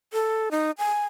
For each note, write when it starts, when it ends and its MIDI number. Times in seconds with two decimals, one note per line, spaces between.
0.13 0.49 69
0.51 0.71 63
0.78 1.05 80